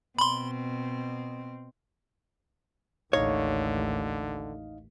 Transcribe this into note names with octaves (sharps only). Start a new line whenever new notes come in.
B2 C4 B5 C6
A1 D#2 D3 D#4 C#5 D#5 F5